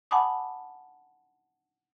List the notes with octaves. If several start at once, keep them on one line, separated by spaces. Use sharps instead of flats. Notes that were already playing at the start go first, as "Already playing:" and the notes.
F#5 G#5 A5 B5 D6 D#6